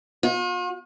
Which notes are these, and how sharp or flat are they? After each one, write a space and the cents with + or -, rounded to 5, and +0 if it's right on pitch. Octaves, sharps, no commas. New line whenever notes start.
F4 +45